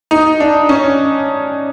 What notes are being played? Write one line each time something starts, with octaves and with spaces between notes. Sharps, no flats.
D#4
D4
C#4